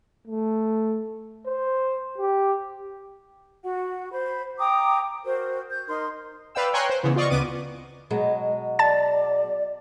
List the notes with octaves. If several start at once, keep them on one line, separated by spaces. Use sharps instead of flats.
A3
C5
G4
F#4 F#5
C5 B5
G5 A#5 D6 D#6
F#4 A#4 C5
G6
D#4 A#4 C6
B4 D5 F5 G5 E6
C#5 G5 G#5 A#5 C6 F#6
C5
C#3 E3 B3
F4 D5 D#5 C#6
C#2 B3 D6 D#7
B2 F#3 G#3
D5 A5 A6